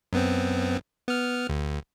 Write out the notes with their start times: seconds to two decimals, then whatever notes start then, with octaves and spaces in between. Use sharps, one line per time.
0.13 F#2 B3 C4
1.08 B3 F6
1.49 D2